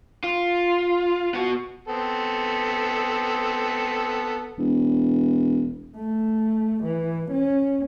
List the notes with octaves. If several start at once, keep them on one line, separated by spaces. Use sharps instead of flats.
F4
B3 F#4
B3 C4 A4
E1
A3
E3
C#4